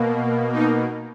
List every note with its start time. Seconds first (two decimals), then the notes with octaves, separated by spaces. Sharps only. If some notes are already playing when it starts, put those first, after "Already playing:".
Already playing: B2 A#3
0.53 D#4